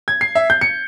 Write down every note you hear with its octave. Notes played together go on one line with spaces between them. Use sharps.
G#6
C7
E5
G6
C#7